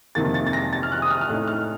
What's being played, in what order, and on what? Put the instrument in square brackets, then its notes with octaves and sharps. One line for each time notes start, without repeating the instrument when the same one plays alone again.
[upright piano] F2 C3 D#3 A#3 A6
A6
A6
A#6
A6
F6
F#6
D#6
F6
F6
A2 A3 D#4 F#6
F6